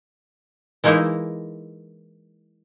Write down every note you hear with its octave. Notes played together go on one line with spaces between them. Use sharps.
E3 G#3 A#3 D#4 E4